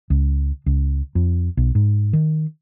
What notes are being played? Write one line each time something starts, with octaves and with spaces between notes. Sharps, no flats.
C#2
C#2
F2
B1
G#2
D#3